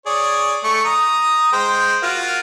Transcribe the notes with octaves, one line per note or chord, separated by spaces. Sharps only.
G#4 C#5 D5
A3 C#6
A#5 D#6
G#3 C5 G5
F4 F#4 A#4